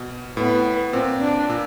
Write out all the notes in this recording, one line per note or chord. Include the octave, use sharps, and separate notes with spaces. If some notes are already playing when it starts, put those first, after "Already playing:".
Already playing: B2
A2 B3
A#2 C4
D4
A#2